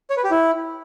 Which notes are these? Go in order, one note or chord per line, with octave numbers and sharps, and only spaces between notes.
C#5
B4
G4
E4